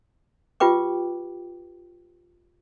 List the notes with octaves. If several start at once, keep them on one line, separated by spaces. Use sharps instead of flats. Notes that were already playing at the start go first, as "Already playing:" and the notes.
F4 G4 B4 G5 D6